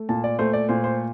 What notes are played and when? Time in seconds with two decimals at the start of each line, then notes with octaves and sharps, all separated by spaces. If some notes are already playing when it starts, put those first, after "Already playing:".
Already playing: A3
0.09 A#2 A5
0.24 D5
0.39 A3 C5
0.53 D5
0.69 A#2 C5
0.84 C5